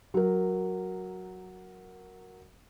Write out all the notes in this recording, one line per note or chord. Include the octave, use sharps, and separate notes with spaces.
F#3 A#4